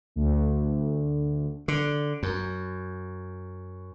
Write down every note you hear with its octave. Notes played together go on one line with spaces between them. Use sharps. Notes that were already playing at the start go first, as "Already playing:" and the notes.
D2
D3
F#2